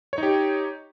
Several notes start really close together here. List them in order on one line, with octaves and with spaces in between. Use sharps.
C#5 D#4 G4